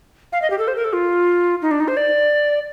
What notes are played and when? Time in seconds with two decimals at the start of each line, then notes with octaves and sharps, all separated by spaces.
0.32 F5
0.42 D#5
0.50 G4
0.58 A4
0.68 C5
0.76 A#4
0.84 A4
0.93 F4
1.62 D#4
1.71 D4
1.80 D#4
1.88 C5
1.97 D5